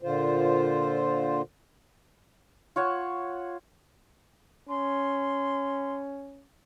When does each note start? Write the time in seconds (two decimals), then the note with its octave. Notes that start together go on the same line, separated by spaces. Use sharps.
0.02 A#2 D3 F4 C5
2.76 F4 C#5 F#5 E6
4.69 C#4 C6